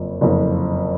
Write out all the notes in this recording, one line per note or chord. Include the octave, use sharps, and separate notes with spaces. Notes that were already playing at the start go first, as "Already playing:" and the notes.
Already playing: F#1 F2 F3
F#1 F2 F3